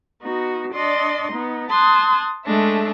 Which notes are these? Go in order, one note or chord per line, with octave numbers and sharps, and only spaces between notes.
B3 D#4 F#4
D4 D5 D#5 C6
B3 D#4
A5 C6 D#6 F#6 G#6
G#3 A3 D4 E5